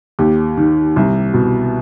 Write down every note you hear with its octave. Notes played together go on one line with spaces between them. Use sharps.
D#2 G4
D#3
C2
B2